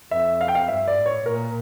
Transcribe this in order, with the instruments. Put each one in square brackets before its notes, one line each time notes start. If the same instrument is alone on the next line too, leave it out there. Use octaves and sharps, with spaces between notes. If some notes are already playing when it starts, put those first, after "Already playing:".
[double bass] F2 [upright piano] E5
[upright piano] F5
G5
F5
[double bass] G2 [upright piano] E5
[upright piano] D5
[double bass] A2
[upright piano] C#5
[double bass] A#2 [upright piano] A#4